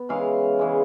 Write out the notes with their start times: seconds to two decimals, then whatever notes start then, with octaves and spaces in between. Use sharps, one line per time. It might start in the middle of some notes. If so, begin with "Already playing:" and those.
Already playing: B3
0.09 C#3 E3 G#3 F5
0.59 C#3 E3 G#3